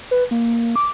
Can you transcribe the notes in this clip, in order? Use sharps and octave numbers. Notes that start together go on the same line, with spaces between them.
B4
A#3
D6